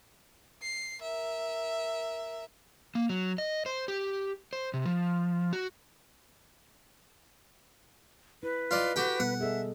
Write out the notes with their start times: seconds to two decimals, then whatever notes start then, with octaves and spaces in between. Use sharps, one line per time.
0.63 C7
1.02 A#4 E5
2.95 A#3
3.09 F#3
3.38 D#5
3.66 C5
3.88 G4
4.53 C5
4.74 C3
4.85 F3
5.53 F#4
8.43 E4 B4
8.71 F4 D5 D#5
8.96 F#4 G4 A4 G5
9.20 B2 G3 B3 F#5
9.41 G#4 A4 D#5 E5